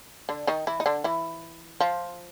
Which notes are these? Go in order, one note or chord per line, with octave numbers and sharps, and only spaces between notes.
D3 D4
D#3 D#4
E3 E4
D#4
D3 D4
E3 E4
F3 F4